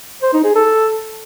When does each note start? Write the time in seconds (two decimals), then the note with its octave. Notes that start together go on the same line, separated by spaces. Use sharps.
0.22 C5
0.33 D#4
0.44 G#4
0.55 A4